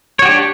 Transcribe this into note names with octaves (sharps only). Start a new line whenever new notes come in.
D4 F#4 G4 C#5